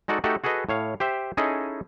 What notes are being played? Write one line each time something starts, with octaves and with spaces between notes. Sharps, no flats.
G#3 D#4 F#4 A4 D5
A3 D#4 F#4 G4 A4
F#4 G#4 A4 B4 D#5
A2 C#5 F5
G4 C5 E5 G5
C#4 D#4 E4 G#4 A4 D#5